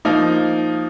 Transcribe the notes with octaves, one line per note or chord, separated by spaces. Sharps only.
F3 A#3 D#4